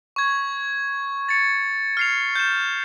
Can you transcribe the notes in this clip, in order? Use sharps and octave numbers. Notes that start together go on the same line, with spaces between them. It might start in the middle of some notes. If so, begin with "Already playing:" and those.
C#6 G#6
A6 C#7
F6 C7 F7
G6 E7